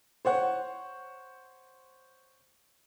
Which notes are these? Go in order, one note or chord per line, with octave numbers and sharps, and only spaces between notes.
C5 C#5 F#5